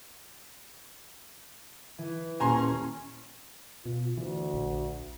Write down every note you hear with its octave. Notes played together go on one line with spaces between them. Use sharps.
E3
D#1 C#4 G#5 A#5 C6
B2 F4
D2 E3
A#1